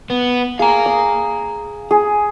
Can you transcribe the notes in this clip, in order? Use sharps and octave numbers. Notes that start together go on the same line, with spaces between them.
B3
G#4 F5 A#5
D#6
G#4